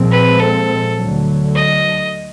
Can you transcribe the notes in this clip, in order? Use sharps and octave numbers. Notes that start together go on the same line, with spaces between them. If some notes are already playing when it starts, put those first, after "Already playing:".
Already playing: A#2 F3 G#3 C4
B4
A4
D2 D3 F#3
D#5